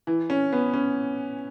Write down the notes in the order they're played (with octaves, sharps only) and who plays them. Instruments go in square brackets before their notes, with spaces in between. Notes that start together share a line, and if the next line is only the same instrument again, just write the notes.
[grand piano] E3
C#4
B3
C#4